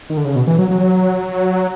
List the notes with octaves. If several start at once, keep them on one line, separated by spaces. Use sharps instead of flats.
D#3
D3
C#3
B2
E3
F#3
F#3